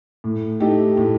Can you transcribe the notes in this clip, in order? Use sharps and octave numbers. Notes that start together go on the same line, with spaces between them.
A2
A3 D#4 G4
A2